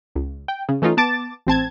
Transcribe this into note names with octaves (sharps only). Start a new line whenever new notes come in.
C#2
G5
C#3
E3 A3 C#4 D#4 F4
B3 A5 D6 A6
A1 C4 A5 G#6